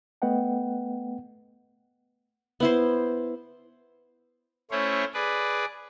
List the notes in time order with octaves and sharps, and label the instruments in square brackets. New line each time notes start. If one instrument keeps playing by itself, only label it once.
[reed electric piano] A3 B3 B4 D#5 F#5 G5
[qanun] B3 E4 C5
[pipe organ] A3 C#4 E4 C5 C#5
G#4 B4 D5